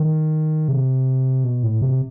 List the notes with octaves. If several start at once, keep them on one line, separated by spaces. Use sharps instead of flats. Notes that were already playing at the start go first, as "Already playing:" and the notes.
Already playing: D#3
C3
B2
A2
C3